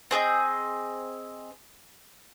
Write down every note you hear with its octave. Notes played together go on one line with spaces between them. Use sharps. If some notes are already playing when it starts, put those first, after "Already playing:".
C4 G#4 D#5 G6